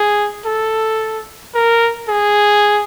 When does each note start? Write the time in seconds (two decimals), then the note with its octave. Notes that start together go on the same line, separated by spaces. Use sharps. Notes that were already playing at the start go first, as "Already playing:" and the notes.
Already playing: G#4
0.46 A4
1.54 A#4
2.08 G#4